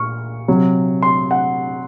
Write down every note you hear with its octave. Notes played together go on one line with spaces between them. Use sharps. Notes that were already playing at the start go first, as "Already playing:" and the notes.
Already playing: A#2 C#6 F6
C3 F#3
C6
F#5